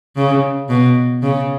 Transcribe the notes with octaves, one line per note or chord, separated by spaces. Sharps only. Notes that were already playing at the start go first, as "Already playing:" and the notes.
C#3
B2
C#3